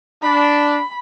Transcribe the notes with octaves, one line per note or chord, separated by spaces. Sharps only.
D4 B5